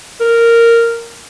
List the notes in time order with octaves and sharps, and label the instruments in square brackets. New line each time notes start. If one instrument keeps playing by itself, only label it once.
[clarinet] A#4